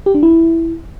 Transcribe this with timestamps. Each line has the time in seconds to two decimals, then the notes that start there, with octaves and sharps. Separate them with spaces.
0.06 G4
0.14 D4
0.23 E4